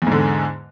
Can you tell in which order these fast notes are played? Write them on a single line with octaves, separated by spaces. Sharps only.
E2 G#2 D3